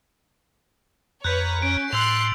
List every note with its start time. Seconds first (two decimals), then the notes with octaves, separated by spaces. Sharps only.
1.24 F2 B4 C#5 A#5 F#6 G6 B6
1.62 C#4 D7
1.93 A2 C6 E6 F#6 G6 C7 F7